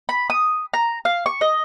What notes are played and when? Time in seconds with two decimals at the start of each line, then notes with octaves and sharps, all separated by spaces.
0.09 B5
0.30 D#6
0.73 A#5
1.05 F5
1.26 C#6
1.41 D#5